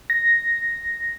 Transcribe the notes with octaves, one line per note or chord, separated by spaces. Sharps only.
A#6